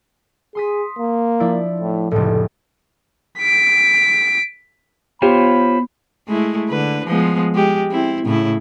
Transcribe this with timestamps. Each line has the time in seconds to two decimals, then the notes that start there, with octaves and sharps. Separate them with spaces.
0.55 G#4 C6 D#6 B6
0.99 A#3
1.40 F3 D4 E4
1.80 A2
2.12 F1 C#2 A2 A4
3.39 B6 D7
5.22 B3 F4 G4 C5 C#5 B5
6.28 G#3 A3 E4
6.70 D3 B4
7.06 F3 G#3 B3
7.54 G#3 G4
7.91 C4 E4
8.25 A2 C#3 E4